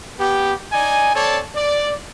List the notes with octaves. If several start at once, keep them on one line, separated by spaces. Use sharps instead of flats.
B3 G4
D#4 D5 G#5
C4 A4 C#5 D5 A5
D5